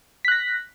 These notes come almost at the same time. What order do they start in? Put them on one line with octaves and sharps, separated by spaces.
B6 F#6 A#6